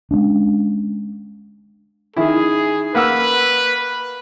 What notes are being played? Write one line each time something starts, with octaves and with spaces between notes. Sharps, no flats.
G#3 B3 C#4 D4
D#3 E4 G#4
A#3 B4 F#5 E6